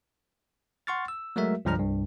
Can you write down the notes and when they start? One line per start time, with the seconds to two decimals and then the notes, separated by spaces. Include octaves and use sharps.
0.87 F#5 C6 C#6 F6 A6
1.08 E6
1.36 F#3 G#3 A3 F#4 A#4 E5
1.65 C#2 G2 F3 D4 A#5 F6
1.79 C2 G2